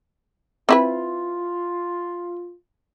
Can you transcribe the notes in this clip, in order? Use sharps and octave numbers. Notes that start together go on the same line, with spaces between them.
C4 E4 F4 B4